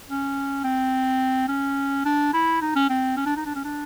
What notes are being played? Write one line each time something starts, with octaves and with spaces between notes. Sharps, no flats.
C#4
C4
C#4
D4
E4
D#4
C#4
C4
C#4
D4
D#4
D4
C#4
D4